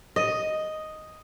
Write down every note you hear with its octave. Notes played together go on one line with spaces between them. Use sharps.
D#5